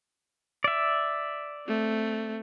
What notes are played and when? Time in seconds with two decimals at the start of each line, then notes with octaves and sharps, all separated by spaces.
0.64 D5 E5
1.67 A3 C4